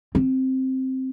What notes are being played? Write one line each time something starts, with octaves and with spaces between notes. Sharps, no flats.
C4